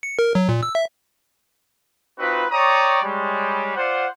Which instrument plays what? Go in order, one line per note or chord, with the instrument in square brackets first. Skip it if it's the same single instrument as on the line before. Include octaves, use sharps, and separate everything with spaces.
[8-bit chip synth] C#7
A#4
F#3
A#2
E6
E5
[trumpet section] C4 D#4 F4 F#4 B4
C#5 D5 G5 A#5 C#6 D#6
G3 G#3 C#5
F4 C5 D5 F#5